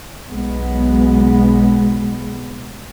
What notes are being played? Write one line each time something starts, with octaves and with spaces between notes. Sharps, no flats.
B1 G#3 B3